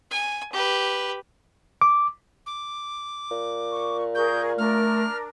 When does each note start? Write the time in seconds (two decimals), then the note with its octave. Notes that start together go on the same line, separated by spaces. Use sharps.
0.10 G#5
0.52 G4 B4
1.81 D6
2.46 D6
3.31 A#2
3.72 C#6
4.15 G#4 A#4 C#6 G6
4.58 A3 D4 A#4 F6